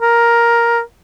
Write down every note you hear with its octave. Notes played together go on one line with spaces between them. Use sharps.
A#4